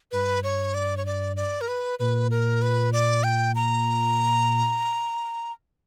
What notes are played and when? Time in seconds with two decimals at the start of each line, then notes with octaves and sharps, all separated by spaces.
0.12 G2 B4
0.44 C#5
0.74 D5
0.97 C#5
1.06 D5
1.36 D5
1.61 A#4
1.68 B4
1.99 A#2 B4
2.31 A#4
2.62 B4
2.93 D5
3.24 G5
3.55 A#5